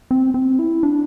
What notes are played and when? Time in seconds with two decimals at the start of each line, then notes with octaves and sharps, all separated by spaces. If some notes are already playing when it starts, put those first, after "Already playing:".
0.11 C4
0.34 C4
0.59 E4
0.83 D4